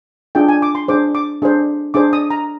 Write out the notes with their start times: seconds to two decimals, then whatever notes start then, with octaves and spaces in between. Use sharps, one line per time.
0.35 D4 F4 G#4 G5
0.48 G#5
0.62 D6
0.75 C6
0.88 D4 G#4 C5 D6
1.15 D6
1.42 D4 G#4 C5
1.94 D4 G#4 C5 D6
2.13 D#6
2.30 A#5